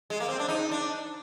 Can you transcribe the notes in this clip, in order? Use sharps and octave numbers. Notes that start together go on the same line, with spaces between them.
G#3
A#3
C4
D4
D#4
D4